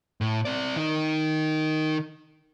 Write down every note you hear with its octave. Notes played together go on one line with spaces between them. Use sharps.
A2
C4 D5
D#3 D#4